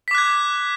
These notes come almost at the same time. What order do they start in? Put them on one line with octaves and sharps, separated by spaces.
B6 D6 F#6 G#6